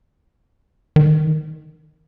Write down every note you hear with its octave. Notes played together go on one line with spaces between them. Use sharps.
D#3